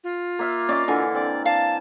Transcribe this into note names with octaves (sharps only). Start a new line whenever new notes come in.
F4
A#3 E5 F5
C#4 D5 D#5 F5
D3 E3 F5 G#5
C4 D5
F5 A5